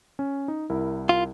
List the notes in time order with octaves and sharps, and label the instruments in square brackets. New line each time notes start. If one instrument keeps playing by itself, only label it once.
[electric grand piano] C#4
D#4
C2 E4 A#4
[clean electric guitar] F4